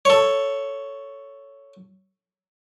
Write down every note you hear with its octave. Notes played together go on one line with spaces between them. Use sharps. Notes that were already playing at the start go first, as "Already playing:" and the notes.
A4 C#5